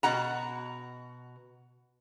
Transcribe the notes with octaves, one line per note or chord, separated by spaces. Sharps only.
B2 F#4 F#5 A#5